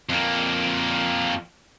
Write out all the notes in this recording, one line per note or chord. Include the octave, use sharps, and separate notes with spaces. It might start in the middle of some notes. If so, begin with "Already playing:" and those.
F2 A#3